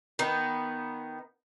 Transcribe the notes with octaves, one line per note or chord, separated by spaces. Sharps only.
D#3 B3